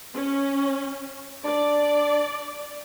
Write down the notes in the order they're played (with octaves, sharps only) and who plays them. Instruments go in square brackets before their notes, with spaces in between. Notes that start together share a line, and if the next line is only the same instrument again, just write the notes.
[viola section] C#4
[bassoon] D4 [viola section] D5